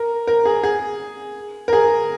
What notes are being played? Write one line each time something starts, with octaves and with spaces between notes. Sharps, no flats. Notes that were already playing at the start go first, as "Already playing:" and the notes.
Already playing: A#4
A#4
G#4
G#4
A#4
G#4